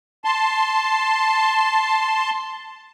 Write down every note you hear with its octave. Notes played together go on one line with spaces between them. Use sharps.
A5 C6